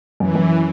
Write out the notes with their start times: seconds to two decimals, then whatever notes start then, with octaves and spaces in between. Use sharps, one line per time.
0.20 F#2 E3
0.35 F#2